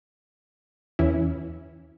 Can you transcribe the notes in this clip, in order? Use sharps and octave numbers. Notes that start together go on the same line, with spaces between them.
E2 E3 C#4 E4